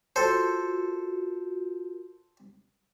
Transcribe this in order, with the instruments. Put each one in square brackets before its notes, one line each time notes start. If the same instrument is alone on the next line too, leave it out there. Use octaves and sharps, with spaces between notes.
[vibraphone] F4 F#4 A#4 [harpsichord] A4 C5